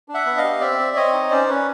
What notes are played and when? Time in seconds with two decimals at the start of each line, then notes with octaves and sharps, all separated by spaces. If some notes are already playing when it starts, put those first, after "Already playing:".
0.08 D4
0.14 E5 F#5
0.26 B3
0.37 D#5 F5
0.44 G4
0.61 C4 D5 E5
0.79 C4
0.96 C4 C#5 D#5
1.13 D#4
1.31 C#4 C5 D5
1.49 C#4 B4 C#5